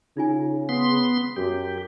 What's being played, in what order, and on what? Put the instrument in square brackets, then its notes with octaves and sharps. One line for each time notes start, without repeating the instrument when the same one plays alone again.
[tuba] C#3 [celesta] D#4 F4 G#5
[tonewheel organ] B3 C6 [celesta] D#6
[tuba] F#2 [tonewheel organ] G4